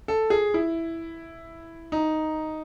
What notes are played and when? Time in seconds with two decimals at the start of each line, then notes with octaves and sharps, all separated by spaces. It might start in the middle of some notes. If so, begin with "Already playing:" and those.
0.08 A4
0.30 G#4
0.54 E4
1.92 D#4